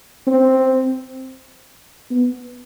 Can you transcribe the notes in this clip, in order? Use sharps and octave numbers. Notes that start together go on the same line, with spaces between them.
C4
B3